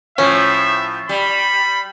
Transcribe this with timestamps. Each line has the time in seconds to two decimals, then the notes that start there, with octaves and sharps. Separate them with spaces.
0.18 A2 F3 C#4 E5
1.09 G3 B5